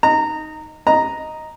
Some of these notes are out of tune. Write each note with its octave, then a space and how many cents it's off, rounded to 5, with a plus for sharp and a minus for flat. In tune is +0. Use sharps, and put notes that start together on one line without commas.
D#4 +0 A#5 -20
D#5 +0 A#5 +0